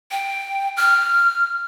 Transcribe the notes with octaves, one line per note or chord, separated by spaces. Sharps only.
G5
F6